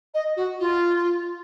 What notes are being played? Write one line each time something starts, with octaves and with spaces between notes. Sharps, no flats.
D#5
F#4
F4